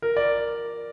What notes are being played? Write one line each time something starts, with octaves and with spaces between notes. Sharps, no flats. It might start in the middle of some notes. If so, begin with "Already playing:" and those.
A#4
D5